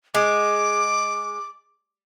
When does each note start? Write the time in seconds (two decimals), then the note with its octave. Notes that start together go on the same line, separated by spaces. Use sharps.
0.15 G#3 D6